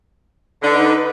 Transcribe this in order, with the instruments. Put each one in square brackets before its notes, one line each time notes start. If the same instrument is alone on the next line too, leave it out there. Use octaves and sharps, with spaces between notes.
[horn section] D3 [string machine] D#4 B4